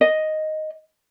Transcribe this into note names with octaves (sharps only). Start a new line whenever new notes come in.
D#5